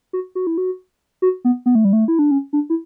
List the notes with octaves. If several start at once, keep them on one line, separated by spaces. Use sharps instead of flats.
F#4
F#4
E4
F#4
F#4
B3
B3
A3
G3
A3
E4
D4
C#4
D4
E4